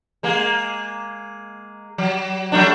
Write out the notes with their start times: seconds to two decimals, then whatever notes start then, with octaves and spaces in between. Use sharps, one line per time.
0.23 G#3 A#3
1.98 F#3
2.52 F#3 A3 D4